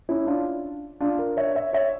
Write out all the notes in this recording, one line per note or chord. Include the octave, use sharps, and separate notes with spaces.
C#4 E4
D4 F4
D4 F4
A#4 D5
C#5 E5
C#5 E5
C#5 E5